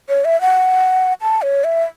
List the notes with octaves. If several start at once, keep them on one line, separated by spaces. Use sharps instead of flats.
C#5
E5
F#5
A5
C#5
E5